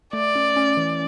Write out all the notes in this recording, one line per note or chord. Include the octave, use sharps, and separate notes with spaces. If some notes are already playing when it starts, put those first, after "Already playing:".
A3 D5
C#4
C#4
E3